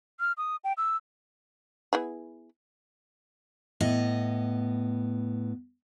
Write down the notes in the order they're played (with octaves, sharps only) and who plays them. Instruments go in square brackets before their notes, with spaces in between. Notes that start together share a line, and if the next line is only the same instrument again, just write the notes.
[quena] F6
D#6
G5
E6
[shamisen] B3 E4 G#4
[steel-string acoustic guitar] A2 B3 D#5